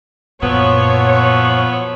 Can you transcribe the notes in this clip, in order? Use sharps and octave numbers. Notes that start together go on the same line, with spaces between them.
F#2 A#2 F3 F#3 B3 C#5